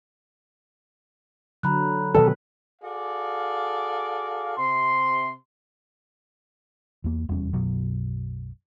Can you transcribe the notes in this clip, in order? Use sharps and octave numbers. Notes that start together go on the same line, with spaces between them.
D3 F#3 A#5 B5 F#6
B2 D#3 F#3 A4 B4
F#4 G#4 A4 D5 F5
C3 C6
E2 A#3
F1 E2 G3 C#4
B1 F#2 B2 F#3